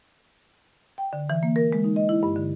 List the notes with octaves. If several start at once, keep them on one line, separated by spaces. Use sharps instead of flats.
G5
D3
E3
A#3
A#4
G#3
D#4
D#5
E4
G2
D3